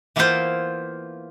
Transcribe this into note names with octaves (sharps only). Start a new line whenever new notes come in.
E3 A#3 B3 E4 F4 C5